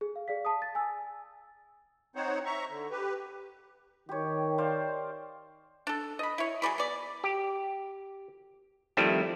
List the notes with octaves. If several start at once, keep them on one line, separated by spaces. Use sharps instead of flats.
G#4
F5
G#4 D5 F5 B6
A5 D#6
A6
G#5 E6
C4 D#4 C5 C#5 F#5
E5 A#5 C#6
D3
G4 B4
D#3 G4 C#5
C5 D5 F5
D4 A4
D#5 B5
E4 C#5
F#3 G#4 D5 B5
B3 D5
G4
D#3 F3 G3 A3 C4 E4